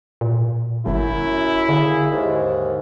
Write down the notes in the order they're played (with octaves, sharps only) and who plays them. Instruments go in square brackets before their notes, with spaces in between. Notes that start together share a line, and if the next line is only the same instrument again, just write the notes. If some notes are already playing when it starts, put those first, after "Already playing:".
[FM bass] A#2
[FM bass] G1 [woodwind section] F#2 [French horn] E4
[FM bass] D3 [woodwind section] A#3 G#4 E5
[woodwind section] D#2 G#2